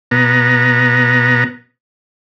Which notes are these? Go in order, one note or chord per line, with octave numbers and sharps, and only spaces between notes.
B2 B3 A#5